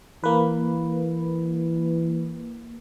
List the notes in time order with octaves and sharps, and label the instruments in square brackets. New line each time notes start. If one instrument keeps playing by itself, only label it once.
[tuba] E3 [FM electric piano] A#3 B4